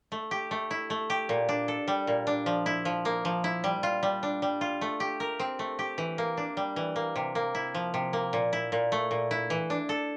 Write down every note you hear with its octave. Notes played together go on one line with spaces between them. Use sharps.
A3
G4
A3
E4
A3
G4
A#2
D4
A4
G3
A#2
D4
F3
E4
F3
A#3
F3
E4
G3
F4
G3
D4
G3
F4
A3
G4
A#4
C4
A3
G4
E3
A#3
D4
G3
E3
A#3
C3
A#3
E4
F3
C3
A#3
A#2
E4
A#2
A3
A#2
E4
E3
D4
A4